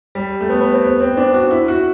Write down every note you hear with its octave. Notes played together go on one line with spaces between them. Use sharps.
G3
A3
B3
B3
C4
B3
C4
C4
D4
F#4
E4
F#4